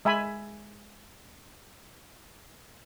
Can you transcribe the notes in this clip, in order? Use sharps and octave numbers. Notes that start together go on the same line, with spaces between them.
G#3 E5 G#5 B5